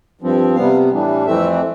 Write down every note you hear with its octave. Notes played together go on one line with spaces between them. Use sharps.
G2 F3 C4
C3 G3 B3 F5
A2 E3 G3 D4
F2 E3 A3 C4 E5